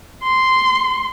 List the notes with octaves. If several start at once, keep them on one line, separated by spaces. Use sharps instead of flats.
C6